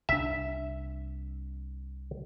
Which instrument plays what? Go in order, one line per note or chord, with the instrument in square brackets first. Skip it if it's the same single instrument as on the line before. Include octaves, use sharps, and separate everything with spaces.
[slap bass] C2 D4 [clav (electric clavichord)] E5